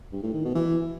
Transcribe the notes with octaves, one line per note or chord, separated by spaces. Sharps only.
G2
A2
D#3
B2
E3